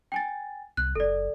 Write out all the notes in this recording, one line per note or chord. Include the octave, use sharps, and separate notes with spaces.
G5 G#5 A6
C2 F#6
F#1 A4 D5